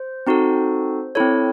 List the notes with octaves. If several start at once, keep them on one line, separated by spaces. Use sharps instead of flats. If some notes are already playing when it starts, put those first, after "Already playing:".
Already playing: C5
C4 D#4 F#4 A4
C4 E4 A4 C#5